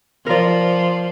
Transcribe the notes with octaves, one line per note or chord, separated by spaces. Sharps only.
F3 A#4 D5